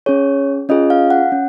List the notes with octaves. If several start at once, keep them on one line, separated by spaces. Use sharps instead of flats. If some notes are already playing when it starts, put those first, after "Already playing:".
C#4 G#4 C#5
C#4 F4 G#4 D#5
F5
F#5
C#4